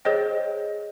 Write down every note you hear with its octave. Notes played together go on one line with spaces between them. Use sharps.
G#4 C5 C#5 D#5 G5